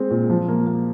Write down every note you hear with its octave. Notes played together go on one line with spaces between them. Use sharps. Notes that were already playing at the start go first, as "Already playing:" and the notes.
Already playing: G#3 C4
A#2
F3
A#3
A#3